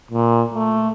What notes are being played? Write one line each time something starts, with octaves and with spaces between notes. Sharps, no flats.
A#2
A3